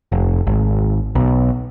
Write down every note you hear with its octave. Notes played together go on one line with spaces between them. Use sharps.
F1
G#1
B1